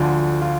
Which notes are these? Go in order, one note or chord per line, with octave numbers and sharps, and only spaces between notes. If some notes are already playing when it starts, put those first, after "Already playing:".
Already playing: D2 D3 F3
F4